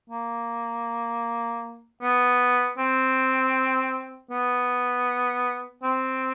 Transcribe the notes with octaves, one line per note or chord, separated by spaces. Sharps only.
A#3
B3
C4
B3
C4